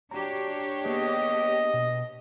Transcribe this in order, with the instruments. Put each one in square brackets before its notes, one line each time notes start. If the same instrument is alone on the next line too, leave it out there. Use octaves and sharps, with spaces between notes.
[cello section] D4 G4 C#5 [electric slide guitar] F#4 A#5
[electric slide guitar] A#3 B3 G#4 [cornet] D#5
[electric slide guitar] B2